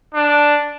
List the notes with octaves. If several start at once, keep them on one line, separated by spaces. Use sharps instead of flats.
D4